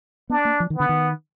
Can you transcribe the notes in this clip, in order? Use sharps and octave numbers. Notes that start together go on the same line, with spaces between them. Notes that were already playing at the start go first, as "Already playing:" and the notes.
B3 D4
A#3
F3
D#3
D3 B3
D#3